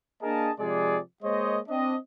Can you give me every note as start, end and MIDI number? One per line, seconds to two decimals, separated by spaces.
0.22 0.50 58
0.22 0.50 62
0.22 0.50 68
0.22 0.50 70
0.22 0.50 75
0.22 0.50 81
0.59 0.98 48
0.59 0.98 53
0.59 0.98 56
0.59 0.98 68
0.59 0.98 74
1.23 1.59 56
1.23 1.59 58
1.23 1.59 72
1.23 1.59 73
1.23 1.59 75
1.68 1.95 60
1.68 1.95 62
1.68 1.95 75